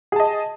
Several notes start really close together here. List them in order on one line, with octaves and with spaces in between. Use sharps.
G#4 A5 D#5